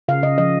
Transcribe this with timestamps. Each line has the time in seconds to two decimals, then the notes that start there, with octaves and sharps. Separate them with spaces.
0.08 C#3 F5
0.23 C#3 D#5
0.38 F3 D#5